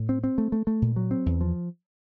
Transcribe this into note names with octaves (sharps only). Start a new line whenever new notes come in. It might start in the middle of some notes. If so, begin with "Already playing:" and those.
Already playing: A2
C4
C4
A3
A3
A3
A#2
F#3
C4
E2
F3